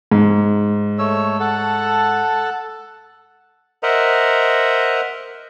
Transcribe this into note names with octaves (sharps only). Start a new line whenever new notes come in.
G#2
A3 C#5 E6
A4 F#5 A5
A#4 C5 D#5 E5 F#5 A#5